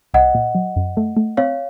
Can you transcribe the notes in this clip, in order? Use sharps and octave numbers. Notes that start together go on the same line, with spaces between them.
C2 D#5 F#5
A#2
F#3
F#2
A3
A3
C4 C#5 F5